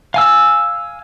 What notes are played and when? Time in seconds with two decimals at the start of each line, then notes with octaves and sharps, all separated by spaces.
0.14 F5 G#5 E6